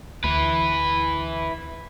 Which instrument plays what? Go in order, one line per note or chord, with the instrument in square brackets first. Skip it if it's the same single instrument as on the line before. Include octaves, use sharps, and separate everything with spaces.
[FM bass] D2 [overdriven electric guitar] E4 B4